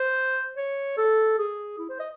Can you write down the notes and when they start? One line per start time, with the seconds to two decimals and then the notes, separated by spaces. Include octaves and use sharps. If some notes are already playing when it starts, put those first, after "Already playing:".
Already playing: C5
0.57 C#5
0.98 A4
1.39 G#4
1.79 E4
1.89 C5
2.00 D#5